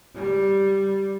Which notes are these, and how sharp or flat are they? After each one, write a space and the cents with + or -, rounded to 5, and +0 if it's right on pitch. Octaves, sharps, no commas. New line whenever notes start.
G3 -5